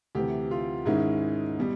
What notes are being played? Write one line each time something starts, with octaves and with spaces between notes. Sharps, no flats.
D2 C3 E3 G4
F4
G#2 D#3 G#3 C#4 E4
B2 G3